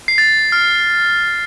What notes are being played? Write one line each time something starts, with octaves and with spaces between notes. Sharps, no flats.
C7
A6
F6